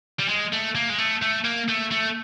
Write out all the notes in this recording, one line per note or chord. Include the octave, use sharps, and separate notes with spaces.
G3
G#3
A3
A#3
G#3
A3
A3
A#3
A3
A3